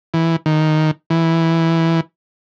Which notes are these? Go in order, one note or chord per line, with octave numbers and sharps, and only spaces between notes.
E3
D#3
E3